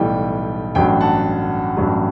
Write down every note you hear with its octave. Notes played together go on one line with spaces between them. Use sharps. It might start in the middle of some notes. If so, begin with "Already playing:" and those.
Already playing: B1 A2 E3 G3 G5
A1 G2 F#3 G5
F#5 A5
A1 G2 F#3